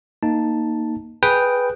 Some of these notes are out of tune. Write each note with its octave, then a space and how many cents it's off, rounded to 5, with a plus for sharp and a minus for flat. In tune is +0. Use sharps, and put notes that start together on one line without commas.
A#3 +0 D#4 +0 A5 +0
G#4 +0 B4 +0 G5 +0